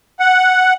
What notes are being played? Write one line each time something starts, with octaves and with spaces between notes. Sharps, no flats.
F#5